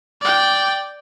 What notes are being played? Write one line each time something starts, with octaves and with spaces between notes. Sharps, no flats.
D5 G5